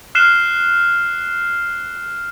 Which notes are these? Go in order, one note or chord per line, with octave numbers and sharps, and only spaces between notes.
F6 F#6 C7 E7 G7